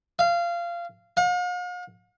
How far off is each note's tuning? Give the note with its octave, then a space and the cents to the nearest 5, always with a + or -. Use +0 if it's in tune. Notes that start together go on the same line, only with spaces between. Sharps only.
F5 -20
F5 +45